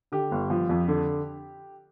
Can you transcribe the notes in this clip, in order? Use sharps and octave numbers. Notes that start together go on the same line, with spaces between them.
D3 G4
G1
F3
F2
D3